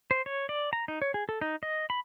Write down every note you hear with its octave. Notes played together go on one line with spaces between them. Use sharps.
C5
C#5
D5
A#5
D#4
C#5
G#4
A4
D#4
D#5
B5